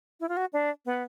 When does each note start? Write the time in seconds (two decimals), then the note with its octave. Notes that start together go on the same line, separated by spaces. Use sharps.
0.20 E4
0.29 F4
0.37 F#4
0.53 D4
0.85 B3